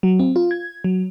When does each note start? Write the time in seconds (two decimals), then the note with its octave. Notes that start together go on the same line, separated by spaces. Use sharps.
0.03 F#3
0.19 C4
0.36 F4
0.51 G#6
0.84 F#3